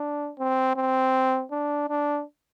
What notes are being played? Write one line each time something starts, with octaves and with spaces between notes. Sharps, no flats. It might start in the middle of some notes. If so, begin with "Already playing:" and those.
Already playing: D4
C4
C4
D4
D4